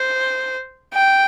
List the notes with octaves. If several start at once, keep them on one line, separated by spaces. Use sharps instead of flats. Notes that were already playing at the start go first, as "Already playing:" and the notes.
Already playing: C5
G5